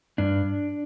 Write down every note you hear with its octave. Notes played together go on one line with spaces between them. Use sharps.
G2 D4